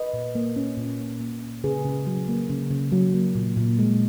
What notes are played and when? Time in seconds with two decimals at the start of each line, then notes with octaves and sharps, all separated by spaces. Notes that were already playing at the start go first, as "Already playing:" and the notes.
Already playing: B4 D#5
0.13 A#2
0.35 A#3
0.56 C#4
0.77 A#2
0.99 A#2
1.20 A#3
1.42 C#4
1.64 C#3 G#4 B4
1.85 C#3
2.07 F#3
2.28 A#3
2.49 C#3
2.71 C#3
2.92 F#3
3.14 A#3
3.35 A#2
3.57 A#2
3.79 G#3